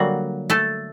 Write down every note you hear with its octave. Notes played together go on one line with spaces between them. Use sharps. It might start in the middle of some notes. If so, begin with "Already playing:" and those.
Already playing: D3 F#3 G3 A#3 F#4
A3 A4